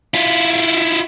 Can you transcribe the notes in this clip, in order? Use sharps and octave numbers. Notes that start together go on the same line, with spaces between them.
E4 F4